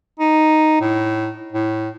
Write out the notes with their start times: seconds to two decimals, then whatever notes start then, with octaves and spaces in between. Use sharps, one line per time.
0.19 D#4
0.80 A2
1.52 A2